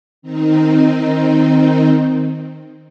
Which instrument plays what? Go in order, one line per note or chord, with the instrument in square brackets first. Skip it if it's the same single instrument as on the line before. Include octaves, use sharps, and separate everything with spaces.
[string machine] D#3 C4 D#4